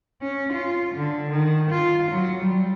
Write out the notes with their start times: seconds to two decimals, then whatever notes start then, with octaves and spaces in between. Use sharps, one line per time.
0.21 C#4
0.53 F4
0.94 D3
1.31 D#3
1.70 F4
2.11 F#3
2.44 G3